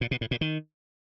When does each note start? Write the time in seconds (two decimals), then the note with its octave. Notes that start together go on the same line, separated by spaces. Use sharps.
0.01 A#2
0.11 B2
0.21 A2
0.31 A#2
0.41 D#3